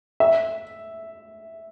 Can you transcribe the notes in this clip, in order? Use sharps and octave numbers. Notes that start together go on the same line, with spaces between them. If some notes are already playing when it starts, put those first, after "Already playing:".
E5